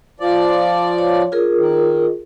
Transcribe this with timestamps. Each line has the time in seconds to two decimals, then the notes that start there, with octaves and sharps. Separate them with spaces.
0.20 F3 D5
0.98 C#5
1.32 F4 G#4 A#4
1.58 D#3